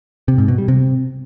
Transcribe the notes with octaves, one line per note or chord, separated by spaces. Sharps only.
C3
G#2
B2
G3
C3